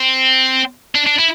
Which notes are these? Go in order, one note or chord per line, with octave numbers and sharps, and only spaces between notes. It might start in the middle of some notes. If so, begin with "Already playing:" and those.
Already playing: C4
D4
D4
E4